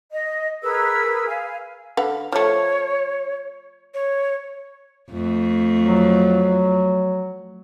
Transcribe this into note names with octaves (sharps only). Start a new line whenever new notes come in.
D#5
G#4 A#4 B4 E6
F5 G#5
D3 B4 F5
F3 A3 C#5
C#5
F2 A3
F#3